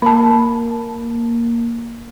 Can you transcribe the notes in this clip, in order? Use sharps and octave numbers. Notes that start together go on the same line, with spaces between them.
A#3 A5 B5